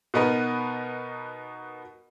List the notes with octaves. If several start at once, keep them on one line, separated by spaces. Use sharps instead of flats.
B2 B3 D#4 A#4 B4